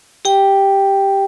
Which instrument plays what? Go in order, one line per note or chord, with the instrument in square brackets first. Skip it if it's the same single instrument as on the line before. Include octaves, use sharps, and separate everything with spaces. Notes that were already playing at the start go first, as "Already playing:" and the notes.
[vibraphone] G4 G5